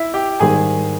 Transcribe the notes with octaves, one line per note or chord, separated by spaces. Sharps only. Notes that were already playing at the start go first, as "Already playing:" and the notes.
Already playing: E4 E5
G4 G5
G#2 D#3 G3 G#4 G#5